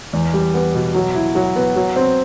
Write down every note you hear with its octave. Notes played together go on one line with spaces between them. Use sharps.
E2
G3
B3
B2
F#3
E4
F#3
B3
F#3
C4